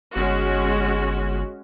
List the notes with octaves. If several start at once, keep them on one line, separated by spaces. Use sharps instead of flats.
G1 G#3 C#4 F#4